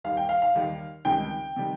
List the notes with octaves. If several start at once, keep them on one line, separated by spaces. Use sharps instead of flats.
D#2 D#3 G3 F5
G5
F5
F5
D#2 D#3 G3
C#2 C3 D#3 G3 G5
C3 D#3 G3